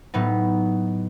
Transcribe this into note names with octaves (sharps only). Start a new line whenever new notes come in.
A2 F#3 B3 D#4